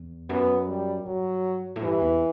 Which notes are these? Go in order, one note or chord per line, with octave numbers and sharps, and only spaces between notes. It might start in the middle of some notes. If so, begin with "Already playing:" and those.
Already playing: E2
F#2 B3
G3
G2 F#3
A2
G2 E3
E2